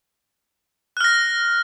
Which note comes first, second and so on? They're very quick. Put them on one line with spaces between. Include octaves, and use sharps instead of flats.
F#6 F6 A#6